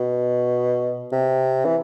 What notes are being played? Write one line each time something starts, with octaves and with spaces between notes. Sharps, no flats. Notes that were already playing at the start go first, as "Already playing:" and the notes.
Already playing: B2
C3
E3